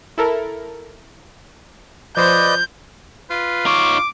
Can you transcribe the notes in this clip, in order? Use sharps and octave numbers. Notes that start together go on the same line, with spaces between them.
E4 A4 A#4
F3 B4 C5 D5 D#5 G6
F4 B4
D#4 C#5 D6